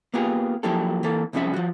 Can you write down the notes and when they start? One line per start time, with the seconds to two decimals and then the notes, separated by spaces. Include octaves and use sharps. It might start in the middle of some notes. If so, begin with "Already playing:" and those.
0.14 A#3 B3 F4 G4 G#4
0.63 F3 F#3 A#3 E4 G4 A4
1.03 E3 A#3 A4
1.33 C2 F#2 F3 C#4 G#4 E5
1.54 F3 F#4